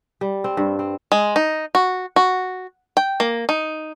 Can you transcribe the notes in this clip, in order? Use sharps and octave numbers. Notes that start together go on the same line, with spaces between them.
G3
C4
G2
C4
G#3
D#4
F#4
F#4
G5
A#3
D#4